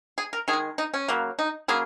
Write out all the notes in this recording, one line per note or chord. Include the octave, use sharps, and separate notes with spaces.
G#4
A#4
D#3 G#4
G#3
D#4
C#4
C#3 F#3 A#3
D#4
C#3 F#3 A#3 G#4